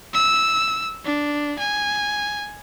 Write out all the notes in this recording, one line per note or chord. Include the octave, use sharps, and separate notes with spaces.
E6
D4
G#5